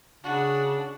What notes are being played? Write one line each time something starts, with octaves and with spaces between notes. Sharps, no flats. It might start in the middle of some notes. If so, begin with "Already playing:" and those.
C#3 D4 F#4